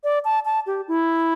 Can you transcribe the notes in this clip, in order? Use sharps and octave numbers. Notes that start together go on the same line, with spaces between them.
D5
A5
A5
G4
E4